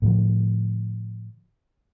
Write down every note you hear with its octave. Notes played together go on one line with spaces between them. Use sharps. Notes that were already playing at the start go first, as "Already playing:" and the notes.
A2 D3 F3